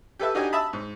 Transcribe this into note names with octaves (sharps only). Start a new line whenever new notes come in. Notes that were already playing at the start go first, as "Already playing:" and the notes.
G4 A4 B4 E5
D4 D#4 F#4 G4 D#5 G#5
E5 A5 B5 D#6
G#2